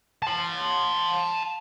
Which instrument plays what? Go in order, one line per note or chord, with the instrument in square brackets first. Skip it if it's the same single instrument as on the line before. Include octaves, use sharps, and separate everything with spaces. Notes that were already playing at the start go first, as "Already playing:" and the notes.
[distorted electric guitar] A5 C6